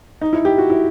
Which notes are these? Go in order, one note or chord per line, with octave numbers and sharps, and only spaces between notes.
D#4
E4
G4
F#4
E4